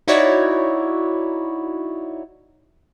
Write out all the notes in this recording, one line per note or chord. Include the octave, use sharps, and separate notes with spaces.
D#4 E4 F#4 C#5 D5